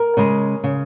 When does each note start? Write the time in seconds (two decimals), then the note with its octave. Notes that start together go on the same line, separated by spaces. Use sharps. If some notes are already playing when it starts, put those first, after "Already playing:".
Already playing: A#4
0.17 C#3 G#3
0.64 C#3